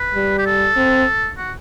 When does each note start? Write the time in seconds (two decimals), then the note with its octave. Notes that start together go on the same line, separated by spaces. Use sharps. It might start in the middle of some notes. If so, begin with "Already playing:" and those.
Already playing: B4
0.15 G3
0.39 G4
0.46 A4
0.76 C4
1.38 F#4